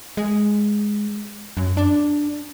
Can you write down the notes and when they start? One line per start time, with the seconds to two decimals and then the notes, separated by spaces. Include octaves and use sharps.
0.17 G#3
1.57 F#2
1.77 D4